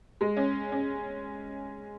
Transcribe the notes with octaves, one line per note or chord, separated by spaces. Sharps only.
G#3
C#4
C#4